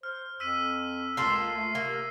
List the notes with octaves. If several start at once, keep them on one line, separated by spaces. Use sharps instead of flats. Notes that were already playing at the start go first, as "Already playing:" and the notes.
C5 F6
F2 E6 B6 D#7
C#2 A#3 F4 A4 C7
A3
C3 A#3